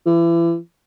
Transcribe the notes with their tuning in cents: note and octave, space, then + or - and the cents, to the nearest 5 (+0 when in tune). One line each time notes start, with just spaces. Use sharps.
E3 +35